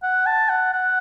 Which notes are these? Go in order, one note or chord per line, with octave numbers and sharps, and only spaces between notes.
F#5
A5
F#5
F#5